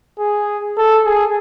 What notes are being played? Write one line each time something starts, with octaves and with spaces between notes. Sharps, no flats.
G#4
A4
G#4